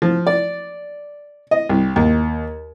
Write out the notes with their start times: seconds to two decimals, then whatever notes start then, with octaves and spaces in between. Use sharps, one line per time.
0.02 F3
0.27 D5
1.51 D#5
1.69 C2
1.96 D#2